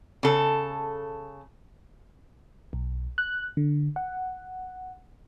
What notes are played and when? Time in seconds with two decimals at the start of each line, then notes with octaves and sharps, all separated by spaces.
0.23 C#3 A4
2.73 B1
3.18 F#6
3.57 D3
3.96 F#5